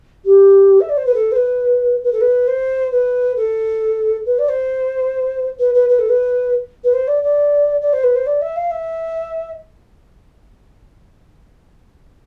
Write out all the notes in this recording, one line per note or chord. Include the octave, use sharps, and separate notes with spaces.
G4
E5
D5
C5
B4
A4
C5
B4
B4
A4
B4
C5
B4
A4
B4
D5
C5
B4
B4
B4
A4
B4
B4
C5
D5
D5
D5
C5
B4
C5
D5
E5
F5
E5